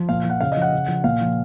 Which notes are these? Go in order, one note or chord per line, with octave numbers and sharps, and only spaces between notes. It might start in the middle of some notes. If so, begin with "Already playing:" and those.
Already playing: F3
A#2 F5
F3
F#5
C#3 F5
D#5
F3
F#5
C#3
F3
A#2 F5
F3